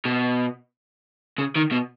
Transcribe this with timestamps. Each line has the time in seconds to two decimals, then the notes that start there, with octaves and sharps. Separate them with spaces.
0.06 B2
1.38 C#3
1.56 D#3
1.71 B2